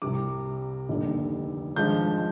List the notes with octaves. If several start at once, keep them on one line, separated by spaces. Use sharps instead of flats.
C2 C3 G3 D6
F1 D#2 D3 G3
G#1 G2 F3 G#3 G6